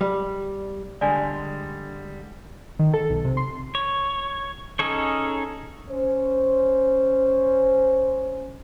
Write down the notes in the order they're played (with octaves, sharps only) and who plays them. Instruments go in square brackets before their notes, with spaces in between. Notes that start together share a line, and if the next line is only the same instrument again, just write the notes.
[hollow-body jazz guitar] G3
[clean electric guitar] D3 G3 G#3 [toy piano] D5 G#5
[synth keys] D#3
A4
B1
C3
C6
[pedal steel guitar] C#5
C#4 D#4 G#4 A4 C#5
[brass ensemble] C#4 C5